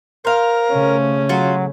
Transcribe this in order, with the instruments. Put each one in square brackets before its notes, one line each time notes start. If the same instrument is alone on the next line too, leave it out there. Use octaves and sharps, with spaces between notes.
[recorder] A#4 [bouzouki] C5 F5
[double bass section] C#3 A3 [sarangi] C#4
[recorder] F#3 [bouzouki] F4 F#4